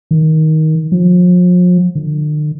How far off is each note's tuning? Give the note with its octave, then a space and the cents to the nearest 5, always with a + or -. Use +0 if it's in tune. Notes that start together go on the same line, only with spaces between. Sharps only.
D#3 +15
F3 +40
D3 +45